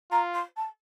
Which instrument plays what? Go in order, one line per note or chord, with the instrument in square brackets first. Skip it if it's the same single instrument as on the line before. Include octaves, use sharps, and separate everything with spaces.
[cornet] F4 [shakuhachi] A#5
[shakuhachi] C6
A5